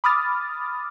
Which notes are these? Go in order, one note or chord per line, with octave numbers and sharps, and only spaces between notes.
B5 D6 D#6 F6 A6